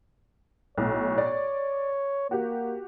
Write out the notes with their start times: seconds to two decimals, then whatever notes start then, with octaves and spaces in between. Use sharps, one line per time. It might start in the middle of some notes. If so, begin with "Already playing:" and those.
0.78 B1 A2 C#5
1.18 D5
2.31 A#3 F#4 G4